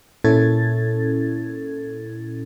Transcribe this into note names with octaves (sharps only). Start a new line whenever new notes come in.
A#2 C#4 E4 A4 G#6 A6